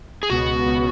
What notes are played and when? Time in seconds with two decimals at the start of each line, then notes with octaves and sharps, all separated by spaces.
0.23 G#4
0.30 C#2 B2 B3 F#4
0.66 C#2 B2 B3